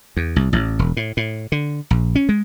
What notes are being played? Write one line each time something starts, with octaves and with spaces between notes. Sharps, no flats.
E2
C2
A1
E1
A2
A2
D3
A#1
C#4
G#3